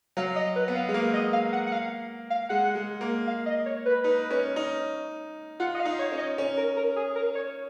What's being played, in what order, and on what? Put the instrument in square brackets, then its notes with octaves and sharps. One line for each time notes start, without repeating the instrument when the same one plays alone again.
[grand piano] F#3 [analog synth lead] F5
[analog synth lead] D#5
B4
[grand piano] B3
[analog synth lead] F5
[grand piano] G#3
[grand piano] A#3 [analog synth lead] F5
[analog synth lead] D#5
F5
F#5
F#5
F5
F5
[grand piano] G#3 [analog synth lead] F#5
[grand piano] G#3
A#3
[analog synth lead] F5
D#5
C#5
B4
[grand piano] D#4
C#4
D#4
[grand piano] F4 [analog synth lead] F#5
[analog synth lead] D#5
F5
[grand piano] D#4
[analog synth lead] C#5
[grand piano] C#4
[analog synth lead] D#5
[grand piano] C#4
[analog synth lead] A#4
A#4
G#4
A#4
C#5